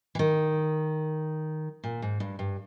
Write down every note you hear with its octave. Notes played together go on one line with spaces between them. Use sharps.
E3
D#3
A#2
G#2
G2
G2